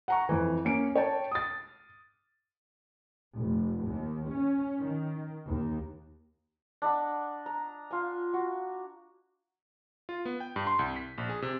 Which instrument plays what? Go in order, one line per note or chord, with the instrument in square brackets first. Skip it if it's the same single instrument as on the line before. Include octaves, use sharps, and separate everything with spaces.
[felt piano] F#5 A#5 C#6
F2 E3
A#3 C#4 D7
C#5 G5 A5
D#6 A6
[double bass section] F1
D#2
C#4
D#3
D#2
[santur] D4 D#5 F#5 B5
A#5
F4 G#5
F#4
[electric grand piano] F4
B3
G5
G2
C6
C2
B6
A#1
G#4
C3